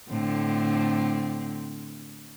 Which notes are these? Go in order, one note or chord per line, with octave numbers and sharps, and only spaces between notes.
A2 D3 C4